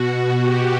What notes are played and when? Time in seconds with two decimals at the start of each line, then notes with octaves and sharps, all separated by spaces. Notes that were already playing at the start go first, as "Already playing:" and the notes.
Already playing: B2 F#4
0.41 G4